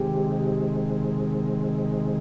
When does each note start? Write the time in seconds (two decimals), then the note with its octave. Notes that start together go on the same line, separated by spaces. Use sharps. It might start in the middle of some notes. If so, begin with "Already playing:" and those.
Already playing: C3 D#3 G#3 G4